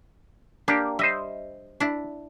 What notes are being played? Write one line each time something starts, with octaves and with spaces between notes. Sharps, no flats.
A#3 D4 G4
G3 C5 D#5 E5
D4 E4